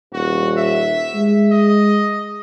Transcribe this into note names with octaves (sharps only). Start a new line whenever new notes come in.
D#1 F#4
E5
G#3
D#5